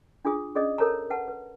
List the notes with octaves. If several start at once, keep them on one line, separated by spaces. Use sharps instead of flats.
D4 F4 G#4 D#6
C#4 G#4 D5 D#5 D#6
A4 A#4 C#5 A5 A#5
B4 F#5 A5
B4